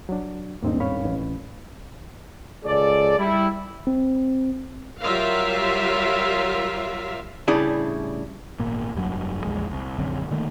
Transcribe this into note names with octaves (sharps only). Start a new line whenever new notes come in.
F#3 D4
D#1 G#1 G2 A#3 C4 D#4
C#5 F5 B5
A1
C#2 G#4 A4 D5
G3 E4
C4
F#3 G3 F4 A#4 E5 F5
A2 C#3 G3 D4 E4 G#4
G#1 A#2 A#3
F1 G2 F#3
A#1 E2 G#3
C2
A#1 F#2 D3 C4
D3 D#3 A3 A#3